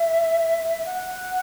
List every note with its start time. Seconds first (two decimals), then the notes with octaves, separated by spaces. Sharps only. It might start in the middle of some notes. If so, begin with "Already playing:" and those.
Already playing: E5
0.86 F#5